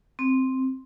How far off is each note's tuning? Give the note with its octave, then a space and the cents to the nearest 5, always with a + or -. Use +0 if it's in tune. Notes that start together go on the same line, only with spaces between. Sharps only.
C4 +0